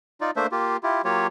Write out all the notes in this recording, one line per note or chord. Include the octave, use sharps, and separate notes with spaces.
D#4 F4 D5
A3 A#3 D4 C5 E5
A#3 F4 G4
E4 F4 G4
F#3 A#3 F4 G4 C#5